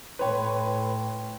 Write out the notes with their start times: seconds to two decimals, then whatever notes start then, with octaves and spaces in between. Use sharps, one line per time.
0.19 A2 B4 C#5 G5 C6